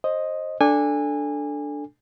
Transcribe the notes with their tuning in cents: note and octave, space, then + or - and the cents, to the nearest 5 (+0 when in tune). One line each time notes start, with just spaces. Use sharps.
C5 +20 D#5 +0
D4 +0 A4 +0 G#5 -25